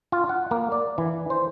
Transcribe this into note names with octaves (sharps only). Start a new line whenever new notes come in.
F4
F#5
A#3
D5
E3
C5